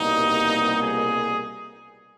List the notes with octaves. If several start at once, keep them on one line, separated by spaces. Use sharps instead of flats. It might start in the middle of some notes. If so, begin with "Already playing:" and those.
Already playing: C2 B2 G3 A#3 D#4
G#4